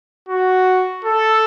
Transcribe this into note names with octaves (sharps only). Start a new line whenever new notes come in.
F#4
A4